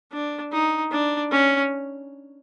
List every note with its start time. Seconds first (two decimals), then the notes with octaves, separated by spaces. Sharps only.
0.12 D4
0.52 D#4
0.91 D4
1.31 C#4